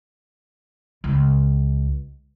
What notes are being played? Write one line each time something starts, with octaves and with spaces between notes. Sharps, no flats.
C#2